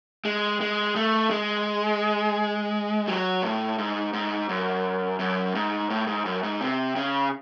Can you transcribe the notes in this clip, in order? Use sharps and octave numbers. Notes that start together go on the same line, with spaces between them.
G#3
G#3
A3
G#3
F#3
A2
G#2
G#2
F#2
F#2
G#2
A2
G#2
F#2
G#2
C3
C#3